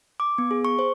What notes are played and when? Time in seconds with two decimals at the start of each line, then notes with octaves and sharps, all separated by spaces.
0.20 D6
0.38 B3
0.51 G#4
0.65 C#6
0.79 C5